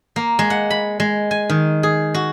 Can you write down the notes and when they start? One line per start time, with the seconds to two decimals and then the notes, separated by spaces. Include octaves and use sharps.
0.16 A#3
0.39 G#3
0.50 F#5
0.70 B5
1.00 G#3
1.31 G#5
1.49 D#3
1.83 G#4
2.14 F#4